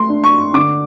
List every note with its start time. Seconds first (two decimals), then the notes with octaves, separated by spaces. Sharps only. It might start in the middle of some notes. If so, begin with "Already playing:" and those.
Already playing: A3 C6
0.09 D4
0.24 C#6
0.54 D3 D6